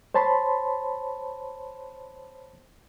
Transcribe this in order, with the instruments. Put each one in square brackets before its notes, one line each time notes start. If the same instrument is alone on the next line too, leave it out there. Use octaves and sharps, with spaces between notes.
[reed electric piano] C5 C#5 A5 B5 C6